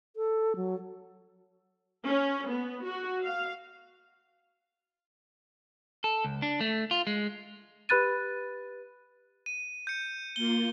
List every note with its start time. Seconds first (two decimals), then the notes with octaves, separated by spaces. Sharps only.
0.16 A4
0.56 F#3
2.06 C#4
2.50 B3
2.85 F#4
3.23 F5
6.04 A4
6.25 C#2
6.42 D4
6.61 A3
6.91 F4
7.07 G#3
7.89 G4 B4 B5 F#6 A6 D#7
9.46 D#7
9.87 G6 C#7
10.36 A#3 F4 G7